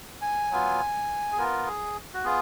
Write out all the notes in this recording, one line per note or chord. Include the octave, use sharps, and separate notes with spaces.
G#5
F#3 B3 F4
G#4
B3 F4 A#4
G#4
F#4
B3 F4 G#4